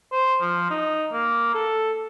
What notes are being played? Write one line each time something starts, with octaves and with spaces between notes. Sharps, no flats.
C5
F3
D#4
A#3
A4